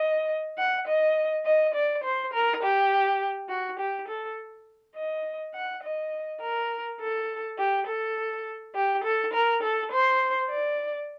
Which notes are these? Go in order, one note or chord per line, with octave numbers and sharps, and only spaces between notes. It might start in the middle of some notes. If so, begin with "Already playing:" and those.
Already playing: D#5
F#5
D#5
D#5
D5
C5
A#4
G4
F#4
G4
A4
D#5
F#5
D#5
A#4
A4
G4
A4
G4
A4
A#4
A4
C5
D5